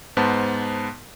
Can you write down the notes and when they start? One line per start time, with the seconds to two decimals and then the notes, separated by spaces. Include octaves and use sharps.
0.17 G#2 B3 C5 A5